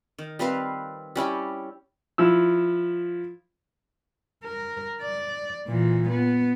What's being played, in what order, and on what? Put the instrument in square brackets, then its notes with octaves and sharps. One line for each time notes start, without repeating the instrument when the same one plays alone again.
[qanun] D#3
G3 C4 B4 F5
G3 C#4 E4 G4
[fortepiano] F3 E4 E6
[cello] A#4
D5
A#2 E3
B3